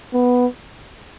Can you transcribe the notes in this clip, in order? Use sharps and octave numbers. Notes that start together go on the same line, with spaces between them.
B3